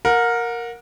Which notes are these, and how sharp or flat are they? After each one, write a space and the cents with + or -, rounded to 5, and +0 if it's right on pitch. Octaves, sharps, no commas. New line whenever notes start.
A#4 +0 F#5 -35